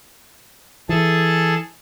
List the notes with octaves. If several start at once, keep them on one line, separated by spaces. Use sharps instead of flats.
E3 G#4 A4 A5